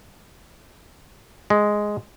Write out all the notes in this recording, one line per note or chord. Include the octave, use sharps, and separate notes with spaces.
G#3